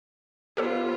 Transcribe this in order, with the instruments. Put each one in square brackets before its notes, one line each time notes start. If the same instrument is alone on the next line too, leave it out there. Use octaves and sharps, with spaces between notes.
[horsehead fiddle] B3 F4 [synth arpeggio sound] G4 A4 C5